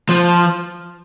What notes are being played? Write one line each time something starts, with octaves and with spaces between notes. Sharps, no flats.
F3